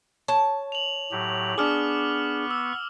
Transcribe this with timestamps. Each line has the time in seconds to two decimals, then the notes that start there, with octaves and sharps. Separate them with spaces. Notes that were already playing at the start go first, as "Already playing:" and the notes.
0.28 C#5 A5
0.72 F7 F#7
1.12 A2 F#3 G4
1.58 B3 D4 G#4 C#6 D6 F6
2.51 E6